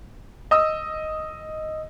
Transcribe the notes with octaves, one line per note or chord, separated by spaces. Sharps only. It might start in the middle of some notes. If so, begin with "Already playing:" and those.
D#5 D#6 E6